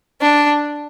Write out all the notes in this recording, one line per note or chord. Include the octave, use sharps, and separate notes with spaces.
D4